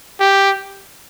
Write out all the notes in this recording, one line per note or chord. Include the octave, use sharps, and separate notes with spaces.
G4